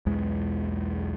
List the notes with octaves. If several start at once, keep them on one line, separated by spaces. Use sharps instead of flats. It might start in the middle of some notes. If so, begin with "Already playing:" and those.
B1 E2 G#3